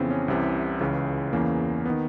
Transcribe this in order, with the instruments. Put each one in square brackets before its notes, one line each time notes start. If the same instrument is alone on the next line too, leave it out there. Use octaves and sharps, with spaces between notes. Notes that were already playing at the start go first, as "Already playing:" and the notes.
Already playing: [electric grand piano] F2 C#3 E3 B3 C4
C#4
C2 C3 E3
C#2 C#3 E3
E2 C#3 E3 A#3
D#3 B3